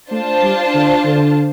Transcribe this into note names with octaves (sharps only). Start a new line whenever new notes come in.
A3 D4 F4 C5 A5
G3
D3
D3